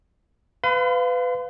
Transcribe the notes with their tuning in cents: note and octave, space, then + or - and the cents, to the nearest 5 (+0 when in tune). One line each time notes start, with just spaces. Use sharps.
B4 +25 F5 +0 C6 -40